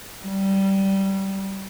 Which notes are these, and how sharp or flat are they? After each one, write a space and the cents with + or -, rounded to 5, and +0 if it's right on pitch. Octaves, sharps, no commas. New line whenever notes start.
G3 -15